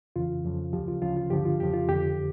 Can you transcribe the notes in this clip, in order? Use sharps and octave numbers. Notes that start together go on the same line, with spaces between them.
F2 C#3 E3 F4
F2 C#3 F3
D2 C#3 F3 G4
F4
D2 C#3 F3 F4
F4
G2 D3 F3 G4
F4
F2 C#3 F3 G4
F4
F2 D3 F3 G4